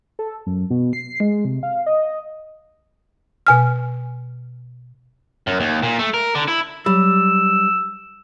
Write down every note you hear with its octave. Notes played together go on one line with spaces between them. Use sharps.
A4
F#2
B2
C7
G#3
C3
F5
D#5
B2 G#5 F6
F#2
D#2
A#2
A3
A#4
D3
E4
F#3 G3 E6